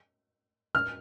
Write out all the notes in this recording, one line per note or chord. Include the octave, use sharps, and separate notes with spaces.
F6